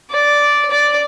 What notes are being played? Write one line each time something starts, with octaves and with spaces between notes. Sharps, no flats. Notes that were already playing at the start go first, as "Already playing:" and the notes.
D5
D5